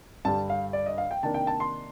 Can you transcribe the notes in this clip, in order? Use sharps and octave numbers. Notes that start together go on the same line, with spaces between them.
G2 D3 G3 A5
F5
D5
D#5
F5
G5
C3 D#3 A#3 D4 A5
G5
A5
C6